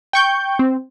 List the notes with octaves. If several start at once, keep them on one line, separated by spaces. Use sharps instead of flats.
G5 C#6 G6
C4